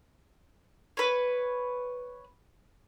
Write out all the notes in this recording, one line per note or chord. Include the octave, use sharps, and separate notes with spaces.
B4 C#5